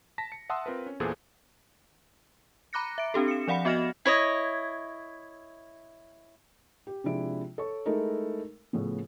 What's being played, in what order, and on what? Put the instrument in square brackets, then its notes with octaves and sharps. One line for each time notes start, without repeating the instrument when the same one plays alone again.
[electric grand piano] A5 A#6 B6
C#7
E5 F#5 A5 C6 D#6 E6
C4 F4 A#4 B4
C#4
E2 A#2 E3 G#4 A4 C5
[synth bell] A#5 B5 D6 F#6 A#6 C#7
E5 D7
C4 D4 G4 A4
C#7 E7
F3 D5 F5 F#5 B5 C#7
B3 F#4 D#5 F6 A#6 E7
[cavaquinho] E4 C#5 D#5
[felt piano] G4
C3 F3 G#3 D4 E4 D7
A4 C#5 C#6
G#3 A3 D#4 E4 A4 A#4
A2 C#3 F3 B3